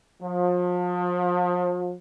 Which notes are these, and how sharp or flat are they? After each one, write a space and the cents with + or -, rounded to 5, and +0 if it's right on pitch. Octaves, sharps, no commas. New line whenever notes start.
F3 +35